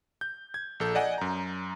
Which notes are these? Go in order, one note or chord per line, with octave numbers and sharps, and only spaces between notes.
G6
G#6
A#1 A4 G6
D5 D#5 F#5 G#5
F#2 A#5